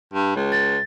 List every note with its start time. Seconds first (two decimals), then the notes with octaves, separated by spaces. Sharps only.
0.14 G2
0.36 C#2
0.52 A6